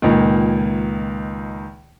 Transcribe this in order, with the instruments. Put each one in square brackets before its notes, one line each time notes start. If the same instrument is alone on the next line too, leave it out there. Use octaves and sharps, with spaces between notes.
[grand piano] C#2 A#2 D#3